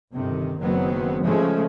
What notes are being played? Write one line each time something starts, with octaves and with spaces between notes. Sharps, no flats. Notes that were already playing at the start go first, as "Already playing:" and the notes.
G1 C3 D#3
F#1 D#3 F#3 B3 C4
C#3 F3 G#3 A3 C#4